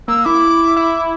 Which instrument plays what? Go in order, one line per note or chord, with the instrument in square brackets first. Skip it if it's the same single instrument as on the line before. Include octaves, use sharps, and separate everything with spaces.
[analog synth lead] A#3 [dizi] E6
[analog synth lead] E4 [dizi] D6
[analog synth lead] E4